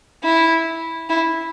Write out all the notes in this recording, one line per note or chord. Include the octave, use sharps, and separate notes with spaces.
E4
E4